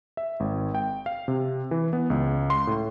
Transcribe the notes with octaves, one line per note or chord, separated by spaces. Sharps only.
E5
G#1
G5
F5
C3
E3
B3
C#2
C6
A2